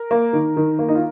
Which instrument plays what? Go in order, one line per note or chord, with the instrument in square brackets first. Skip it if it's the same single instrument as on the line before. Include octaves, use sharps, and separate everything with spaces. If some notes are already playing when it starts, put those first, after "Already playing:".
Already playing: [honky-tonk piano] A#4
A#3
D#3
D#3
A#3
D#4
F4